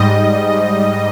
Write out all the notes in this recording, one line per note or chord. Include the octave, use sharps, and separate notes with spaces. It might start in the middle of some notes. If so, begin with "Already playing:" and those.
Already playing: G#2 G3 D#5